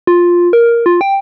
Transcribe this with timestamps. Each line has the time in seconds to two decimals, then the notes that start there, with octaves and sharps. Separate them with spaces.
0.07 F4
0.53 A#4
0.86 F4
1.01 G5